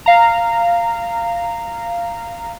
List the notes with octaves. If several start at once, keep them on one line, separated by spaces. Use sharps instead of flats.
F5 A#5